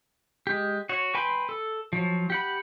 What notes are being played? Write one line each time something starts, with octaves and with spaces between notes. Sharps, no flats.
G#3 G4
F#4 C#5
B4 G5 G#5 B5 C6
A4
F3 F#3
G4 F#5 B5